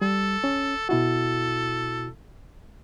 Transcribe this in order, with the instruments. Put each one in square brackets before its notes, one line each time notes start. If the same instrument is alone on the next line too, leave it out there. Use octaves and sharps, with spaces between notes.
[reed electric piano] G3 [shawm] A4
[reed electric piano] C#4
[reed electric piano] B2 E4 F#4 [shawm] A4